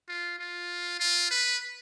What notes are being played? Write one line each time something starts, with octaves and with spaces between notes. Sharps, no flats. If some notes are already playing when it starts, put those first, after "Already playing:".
F4
F4
F4
B4